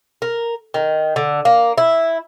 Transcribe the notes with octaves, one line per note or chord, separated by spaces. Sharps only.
A#4
D#3
D3
A#3
E4